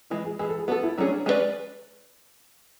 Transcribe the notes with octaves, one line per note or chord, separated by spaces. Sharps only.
E3 G#3 E4
G#4
E3 G#3 G#4
A4
G#4
B3 D4 F#4 A4
E4
F#3 A3 C#4 D4 G#4
G#3 C#4 G#4 B4 D5